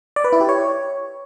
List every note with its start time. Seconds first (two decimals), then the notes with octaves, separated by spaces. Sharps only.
0.16 D5
0.24 B4
0.33 E4
0.41 G4
0.49 C#5